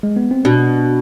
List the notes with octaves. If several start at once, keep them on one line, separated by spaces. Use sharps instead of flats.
G#3
B3
C4
B2 D4